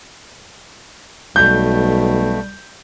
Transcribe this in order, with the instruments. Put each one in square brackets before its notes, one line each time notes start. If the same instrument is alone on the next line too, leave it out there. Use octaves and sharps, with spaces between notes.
[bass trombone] B1 [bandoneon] B2 A3 [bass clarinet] G3 [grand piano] G6